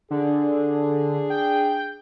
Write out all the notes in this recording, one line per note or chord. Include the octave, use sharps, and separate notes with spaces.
D3 D4 G#4
G5